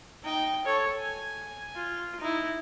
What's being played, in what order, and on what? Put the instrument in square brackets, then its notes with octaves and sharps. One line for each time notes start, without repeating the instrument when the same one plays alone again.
[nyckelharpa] D#4 G5
A4 C#5
G#5
F4
D#4 E4